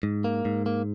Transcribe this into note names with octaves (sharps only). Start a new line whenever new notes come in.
G#2
A#3
G#2
A#3